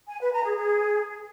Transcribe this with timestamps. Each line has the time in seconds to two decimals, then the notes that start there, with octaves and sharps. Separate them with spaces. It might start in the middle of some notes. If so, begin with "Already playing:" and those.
0.08 G#5
0.20 B4
0.31 A#5
0.43 G#4
0.55 G#4